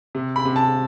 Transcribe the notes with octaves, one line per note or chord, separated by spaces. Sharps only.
C3
B5
C3
A5